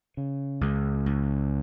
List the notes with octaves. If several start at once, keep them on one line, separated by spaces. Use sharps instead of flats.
C#3
C#2
C#2